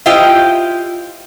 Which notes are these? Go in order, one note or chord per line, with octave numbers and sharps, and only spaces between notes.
E4 F4 G4 C5 D#5 G5